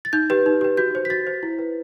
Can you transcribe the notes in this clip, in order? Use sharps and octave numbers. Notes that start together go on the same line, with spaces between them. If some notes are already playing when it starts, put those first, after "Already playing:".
A6
D#4 G6
G4 B4
D#4
G4 B4
F#4 G6
C5
B6
F#4 A6
C5
E4
B4